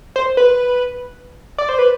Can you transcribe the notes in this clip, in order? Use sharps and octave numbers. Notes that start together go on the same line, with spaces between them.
C5
B4
D5
C5
B4